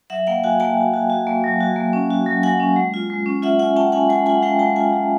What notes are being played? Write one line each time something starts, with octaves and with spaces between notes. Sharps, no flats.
F#3 E5 F#5
A#3 F5 G5
F#4 F#5 G#5
A#3 G5 A5
F#4
F#4
F#4
A#3
F#3
F#4
A#3
C#4
F#4
F#3
F#3 F#5 G#5
C#4
G#3
F4
G#3
C#4
F4 E5 F#5
F4 F#5 G#5
C#4 G5 A5
C#4 F#5 G#5
G#3 F#5 G#5
F4 F#5 G#5
G#3 F5 G5
G#3 G5 A5
F4 F#5 G#5
G#3